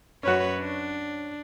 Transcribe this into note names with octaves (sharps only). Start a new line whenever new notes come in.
F#2 C#4 F#4 B4 C#5
D4